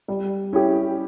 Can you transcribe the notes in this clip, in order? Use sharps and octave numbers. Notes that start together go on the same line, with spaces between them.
G3
C#4 E4 G4